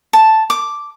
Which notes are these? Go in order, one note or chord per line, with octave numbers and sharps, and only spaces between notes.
A5
D6